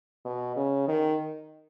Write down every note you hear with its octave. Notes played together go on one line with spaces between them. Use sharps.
B2
C#3
D#3